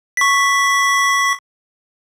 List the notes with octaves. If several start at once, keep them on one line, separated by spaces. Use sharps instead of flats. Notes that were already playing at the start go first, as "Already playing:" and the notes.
C#6 B6